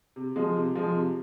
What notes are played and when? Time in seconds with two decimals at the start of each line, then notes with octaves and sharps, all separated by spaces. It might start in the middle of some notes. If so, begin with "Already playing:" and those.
0.16 C3
0.36 F3 G#3
0.56 C3
0.75 F3 G#3
0.95 C3